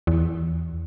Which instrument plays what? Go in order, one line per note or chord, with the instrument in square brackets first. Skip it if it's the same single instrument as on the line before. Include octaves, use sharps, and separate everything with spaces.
[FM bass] E2